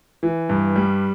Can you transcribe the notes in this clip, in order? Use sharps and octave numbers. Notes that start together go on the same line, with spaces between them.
E3
G2
G3